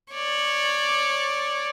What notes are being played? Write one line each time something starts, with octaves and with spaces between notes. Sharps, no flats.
C#5 D5